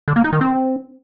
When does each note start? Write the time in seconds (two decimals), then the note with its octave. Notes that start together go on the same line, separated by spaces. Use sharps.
0.08 D3
0.16 A#3
0.24 D#4
0.33 D#3
0.41 C4